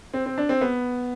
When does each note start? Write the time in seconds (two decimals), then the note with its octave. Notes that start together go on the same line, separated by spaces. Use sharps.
0.14 C4
0.26 C4
0.38 D4
0.49 C4
0.61 B3